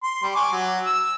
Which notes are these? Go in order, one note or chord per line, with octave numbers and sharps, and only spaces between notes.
C6
G3
G#5 C#6 D6
F#3
E6